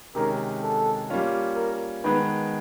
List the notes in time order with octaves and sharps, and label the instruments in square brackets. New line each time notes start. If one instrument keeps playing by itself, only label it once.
[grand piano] C3 D#3 G#3 C#4 [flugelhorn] A#4
[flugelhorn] A4
[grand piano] G3 A#3 C#4 F4
[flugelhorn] A#4
[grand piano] D#3 G#3 B3 [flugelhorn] B4